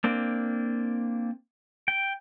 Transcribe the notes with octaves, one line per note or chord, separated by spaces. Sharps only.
A#3 C4 D4
G5